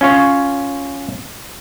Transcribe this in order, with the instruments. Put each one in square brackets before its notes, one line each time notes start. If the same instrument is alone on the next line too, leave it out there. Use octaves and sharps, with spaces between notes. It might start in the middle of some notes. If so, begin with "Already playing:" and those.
[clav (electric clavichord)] C#4 F4 C#5